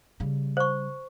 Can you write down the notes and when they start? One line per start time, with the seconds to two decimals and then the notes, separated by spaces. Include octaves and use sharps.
0.20 C#3 G3
0.57 C5 C#6